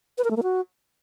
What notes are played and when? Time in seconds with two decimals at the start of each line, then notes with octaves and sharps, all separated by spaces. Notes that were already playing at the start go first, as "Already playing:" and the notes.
0.18 B4
0.24 A#4
0.31 A3
0.37 A#3
0.43 F#4